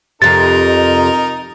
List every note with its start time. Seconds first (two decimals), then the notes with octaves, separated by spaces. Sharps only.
0.22 F2 C3 D#4 A#4 A6